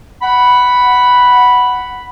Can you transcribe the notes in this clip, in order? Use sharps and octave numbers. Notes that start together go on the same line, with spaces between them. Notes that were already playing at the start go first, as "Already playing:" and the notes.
F#5 B5